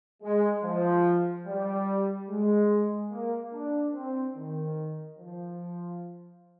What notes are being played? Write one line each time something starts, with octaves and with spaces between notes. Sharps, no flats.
G#3
F3
G3
G#3
A#3
D4
C4
D#3
F3